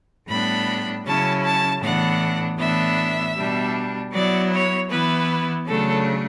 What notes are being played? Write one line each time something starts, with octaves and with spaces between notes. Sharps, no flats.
A2 G3 B3 D4 B5
C#3 F#3 C#4 E4 A5
A5
A2 E3 B3 D4 F#5
A2 E3 B3 D4 E5
B2 G3 D4
F#3 B3 E4 D5
C#5
E3 B3 E4 B4
C#3 F#3 A3 D4 A4